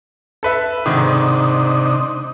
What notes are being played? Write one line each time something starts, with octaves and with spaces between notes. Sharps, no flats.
A4 B4 E5
G#2 C3 D#3 D4 D#4